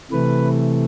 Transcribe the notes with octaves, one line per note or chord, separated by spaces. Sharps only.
C3 E3 A3 B4